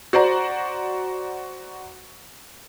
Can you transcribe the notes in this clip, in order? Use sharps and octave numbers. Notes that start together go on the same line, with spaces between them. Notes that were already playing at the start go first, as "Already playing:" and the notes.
F#4 C5 D5 A#5